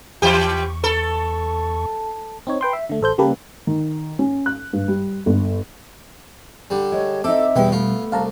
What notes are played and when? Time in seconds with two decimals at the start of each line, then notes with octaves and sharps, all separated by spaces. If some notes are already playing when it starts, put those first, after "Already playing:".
0.22 E2 E3 G4 C#6
0.84 A4
2.47 C4 D#4 C#5
2.61 B4 G5 C6
2.73 E5
2.89 D3 A3
3.01 A1 A4 C5 G6
3.18 C#3 G3 A#3 G4 A4 B4
3.67 D#3
4.19 C#4
4.46 F#6
4.73 G2
4.88 G3
5.26 G1
6.70 D3 G3
6.92 G#3 C#5
7.24 C4 D#4 A4 E5 D6
7.56 E2 B2 G3 B3 G5
7.72 A3 B3 F4
8.12 C2 F5 A5 A#5